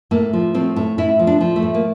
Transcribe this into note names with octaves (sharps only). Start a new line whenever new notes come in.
A2 A#3
F3
A2 C4
A2
A2 E4
F3
D4
F3
A3
A2
A#3